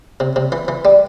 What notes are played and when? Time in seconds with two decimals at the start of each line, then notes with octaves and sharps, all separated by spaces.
0.20 C3
0.36 C3
0.52 E3
0.68 E3
0.85 G3